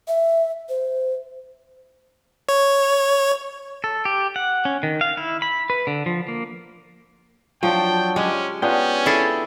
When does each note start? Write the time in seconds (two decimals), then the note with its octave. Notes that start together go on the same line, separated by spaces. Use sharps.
0.08 E5
0.69 C5
2.49 C#5
3.84 A4
4.05 G4
4.36 F#5
4.65 C#4
4.83 D#3
5.01 F5
5.17 E4
5.42 B5
5.70 B4
5.87 D3
6.06 F3
6.28 A#3
7.63 F3 F#3 D4 G5
8.16 G#3 C#4 G4
8.62 B3 C#4 D4 F4 G5
9.06 E4 G#4 A4